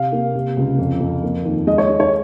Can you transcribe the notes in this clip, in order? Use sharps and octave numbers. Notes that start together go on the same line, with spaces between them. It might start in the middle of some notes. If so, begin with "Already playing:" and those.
Already playing: C3 F5
A#3
C3
C#2
F2
F2
A#3
D#2
G#3 D#5
C#5
G#3
C#5